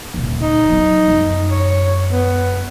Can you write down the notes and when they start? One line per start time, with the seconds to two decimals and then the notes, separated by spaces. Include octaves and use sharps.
0.14 D#1 D2
0.42 D#4
0.69 F#3 B3
1.08 F#2
1.51 C#5
2.10 B3